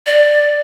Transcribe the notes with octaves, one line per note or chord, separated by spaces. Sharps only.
D5